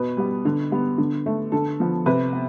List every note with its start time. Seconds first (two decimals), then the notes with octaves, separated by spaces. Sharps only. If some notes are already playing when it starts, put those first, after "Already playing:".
Already playing: B2 B4
0.17 G3 B3
0.45 D3
0.71 G3 B3
0.98 D3
1.26 A3
1.52 D3 A4
1.80 F3 B3
2.06 C3 B4
2.33 B3